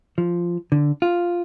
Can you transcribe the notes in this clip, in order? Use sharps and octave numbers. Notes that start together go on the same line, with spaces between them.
F3
D3
F4